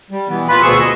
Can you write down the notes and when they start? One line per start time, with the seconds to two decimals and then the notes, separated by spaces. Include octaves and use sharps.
0.11 G3
0.29 B2 E3 B3
0.48 A#2 F4 B4 B5
0.62 D2 B2 C4 G#4 C#6 E6
0.80 D#5